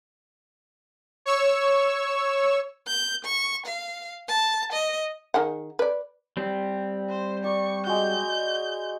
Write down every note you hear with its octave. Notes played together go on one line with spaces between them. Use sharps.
C#5 C#6 E6
G6
C#6
F5
A5
D#5
D#3 G#4 F#5
B4 D5
G3 C4
C5
D5 B5 C#6
G#3 F#4 G6